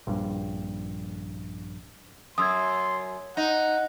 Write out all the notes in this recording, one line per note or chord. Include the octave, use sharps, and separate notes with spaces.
A#1 G2
F#2 C6 D#6 E6 G#6
D#4 F#5